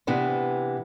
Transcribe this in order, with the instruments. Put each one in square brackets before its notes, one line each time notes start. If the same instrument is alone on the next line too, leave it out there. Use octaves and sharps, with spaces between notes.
[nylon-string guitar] C3 E3 B3 D4